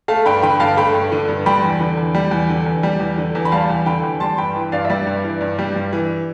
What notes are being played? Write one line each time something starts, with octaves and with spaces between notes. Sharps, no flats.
A3 F5 A5
G2 G5 B5
D3 G5 B5
G2 F5 A5
A3 G5 B5
G2
D3
G2
G3 G5 B5
E2
D3
E2
G3
E2
D3
E2
G3
E2
D3
E2
B5
G3 F5 A5
E2
D3 G5 B5
E2
G3 A5 C6
G2 G5 B5
E3
G2 D5 F5
E5
G3 D5
G2
E3
G2
G3
G2
E3